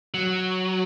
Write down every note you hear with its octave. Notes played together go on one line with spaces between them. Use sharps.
F#3